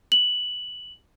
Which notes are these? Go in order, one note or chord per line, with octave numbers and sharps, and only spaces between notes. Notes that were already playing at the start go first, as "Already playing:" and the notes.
F#7